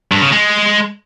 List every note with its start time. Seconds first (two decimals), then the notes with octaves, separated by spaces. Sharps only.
0.12 G2
0.22 C#3
0.32 G#3